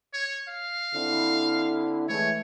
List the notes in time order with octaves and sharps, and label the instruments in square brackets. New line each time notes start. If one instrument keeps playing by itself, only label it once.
[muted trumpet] C#5
F5
[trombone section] D3 C4 E4
[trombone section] E3 G#3 A3 [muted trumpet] C#5